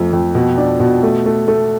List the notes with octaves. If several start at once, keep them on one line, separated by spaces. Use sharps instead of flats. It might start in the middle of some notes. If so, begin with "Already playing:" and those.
Already playing: F2 A3
F2
B2
D4
B2
A3
A3
A3